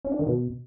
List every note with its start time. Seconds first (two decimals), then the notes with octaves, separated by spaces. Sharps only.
0.05 C#4
0.12 D4
0.19 D#3
0.26 B2